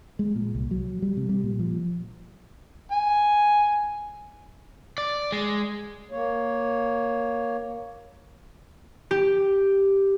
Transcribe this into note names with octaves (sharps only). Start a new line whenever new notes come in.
G#3
A#2
C2
F#3
G3
C3
G3
A#2
F3
G#5
D5
G#3
A#3 C#5
G4